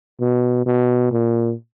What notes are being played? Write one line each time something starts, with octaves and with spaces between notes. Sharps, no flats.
B2
B2
A#2